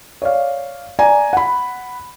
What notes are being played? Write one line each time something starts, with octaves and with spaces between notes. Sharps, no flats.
C#5 D5 F5
D5 G#5 A#5
F#5 B5